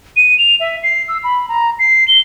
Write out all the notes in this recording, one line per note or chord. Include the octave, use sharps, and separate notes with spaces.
D#7
F7
E5
C7
E6
B5
A#5
C7
G7